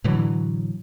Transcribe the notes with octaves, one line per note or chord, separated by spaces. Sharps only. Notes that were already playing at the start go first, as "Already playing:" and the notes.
A2 D3 E3 F#3